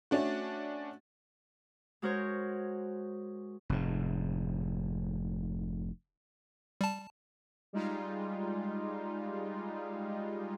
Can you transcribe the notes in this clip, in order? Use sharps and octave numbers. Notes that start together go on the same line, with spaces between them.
A3 C#4 D4 F#4
G#3 F#4 A#4 C5 C#5
F1 G#2
G3 A5
G3 G#3 D#4 F4